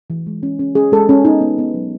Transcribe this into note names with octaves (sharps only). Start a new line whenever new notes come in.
E3
G#3
C#4
C#4
C#4 G#4
G#3 A4
C#4
B3 D#4
B3
B3
F#3